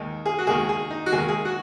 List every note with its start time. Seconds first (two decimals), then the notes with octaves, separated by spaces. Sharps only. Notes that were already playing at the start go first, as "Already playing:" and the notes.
Already playing: D#2 D#3 G#3 D#4
0.26 G#4
0.38 F#4
0.47 D#2 D#3 G#3 G#4
0.69 G#4
0.91 D#4
1.06 F#4
1.12 D#2 D#3 G#3 G#4
1.28 G#4
1.45 F#4